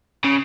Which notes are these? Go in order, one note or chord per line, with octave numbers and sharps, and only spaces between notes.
C#3